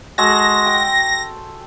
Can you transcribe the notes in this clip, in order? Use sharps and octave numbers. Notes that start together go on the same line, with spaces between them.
G#3 F#4 A4 A#6
G5